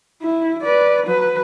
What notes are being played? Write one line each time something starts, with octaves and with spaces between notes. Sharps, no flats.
E4
B4 D5
F#3 B4